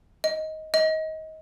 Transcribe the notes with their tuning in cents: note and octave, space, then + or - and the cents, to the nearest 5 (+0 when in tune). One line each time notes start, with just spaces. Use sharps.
D#5 +15
D#5 +25